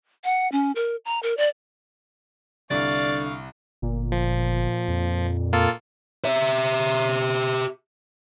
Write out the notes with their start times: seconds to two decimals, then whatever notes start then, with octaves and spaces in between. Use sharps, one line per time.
0.24 F#5
0.52 C#4
0.75 A#4
1.05 A#5
1.23 A#4
1.37 D5
2.70 C2 D3 D5 F5 C#6
3.82 G1 A#2
4.12 F3
4.88 F2
5.53 A#3 F4 A4
6.25 G4 E5